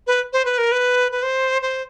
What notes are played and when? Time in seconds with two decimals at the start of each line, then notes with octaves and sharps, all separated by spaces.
0.07 B4
0.33 C5
0.45 B4
0.58 A#4
0.72 B4
1.12 B4
1.22 C5
1.62 C5